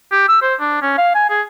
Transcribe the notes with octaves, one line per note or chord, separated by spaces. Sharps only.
G4
E6
C5
D4
C#4
F5
G#5
G#4